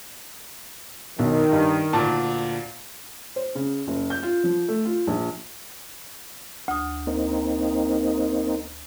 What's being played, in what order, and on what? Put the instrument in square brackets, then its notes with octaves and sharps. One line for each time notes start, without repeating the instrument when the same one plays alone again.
[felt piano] B1 [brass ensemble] D#3
[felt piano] G2
[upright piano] D2 A#2 [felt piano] A5
[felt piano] C5
C#3
F#1
G6
F4
F3
A3
F4
A#1
[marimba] D2 D#6
[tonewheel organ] A#3 C4 D#4